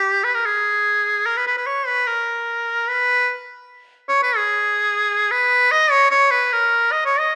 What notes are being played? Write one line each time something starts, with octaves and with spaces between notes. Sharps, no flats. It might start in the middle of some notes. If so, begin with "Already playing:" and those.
Already playing: G4
B4
A#4
G#4
A#4
B4
B4
B4
C#5
B4
A#4
B4
C#5
B4
G#4
B4
D#5
C#5
C#5
B4
A#4
D#5
C#5
D#5